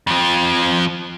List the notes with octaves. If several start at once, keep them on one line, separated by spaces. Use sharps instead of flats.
F2 F3